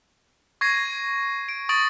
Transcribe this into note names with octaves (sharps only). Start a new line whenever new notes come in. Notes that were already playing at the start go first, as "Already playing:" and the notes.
C#6 G#6 A#6 C7 D#7
D7
C#6 D#6 A6 D7 F#7